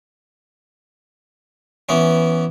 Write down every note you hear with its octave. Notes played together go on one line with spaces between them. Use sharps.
E3 B3 C#4